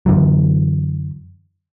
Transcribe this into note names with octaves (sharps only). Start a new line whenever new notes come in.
F#2 D3 E3 F#3